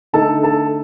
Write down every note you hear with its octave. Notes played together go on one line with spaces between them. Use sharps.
D3 A3 D#4 A4 A5
A4 A5